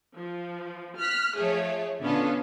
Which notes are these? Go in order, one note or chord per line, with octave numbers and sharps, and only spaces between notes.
F3
F6 F#6 B6
F3 A3 G#4 C#5
B2 D3 B3 C#4 F4 A4